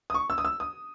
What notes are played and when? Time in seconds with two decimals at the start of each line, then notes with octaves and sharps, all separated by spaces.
0.10 D#6
0.14 C#6
0.30 E6
0.38 D#6
0.45 E6
0.60 D#6